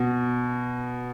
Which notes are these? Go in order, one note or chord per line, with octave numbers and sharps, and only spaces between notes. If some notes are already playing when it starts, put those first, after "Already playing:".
Already playing: B2